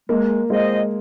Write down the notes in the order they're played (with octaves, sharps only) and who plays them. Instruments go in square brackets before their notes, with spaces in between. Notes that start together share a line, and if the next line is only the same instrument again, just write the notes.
[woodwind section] G#3 [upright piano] A#3
[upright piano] G#3 [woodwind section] C4 F4 C5 D#5